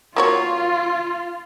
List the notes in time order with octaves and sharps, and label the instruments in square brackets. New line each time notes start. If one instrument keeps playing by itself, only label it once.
[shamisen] A#3 F#4 C#5 [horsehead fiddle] F4